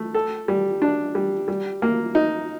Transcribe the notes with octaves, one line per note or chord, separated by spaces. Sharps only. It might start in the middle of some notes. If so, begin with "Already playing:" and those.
Already playing: A3
A4
G3
D4
G3
G3
A#3
D#4